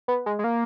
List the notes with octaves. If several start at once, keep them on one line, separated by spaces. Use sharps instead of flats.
B3
G#3
G#3
A#3